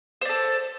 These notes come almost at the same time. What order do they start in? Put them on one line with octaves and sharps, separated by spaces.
C5 D5 A4